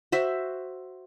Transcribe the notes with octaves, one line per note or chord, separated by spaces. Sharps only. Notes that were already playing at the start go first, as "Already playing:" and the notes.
F#4 C5 E5